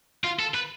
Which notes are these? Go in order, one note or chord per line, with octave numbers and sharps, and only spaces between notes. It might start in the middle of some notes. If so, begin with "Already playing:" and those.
F4
A4
B4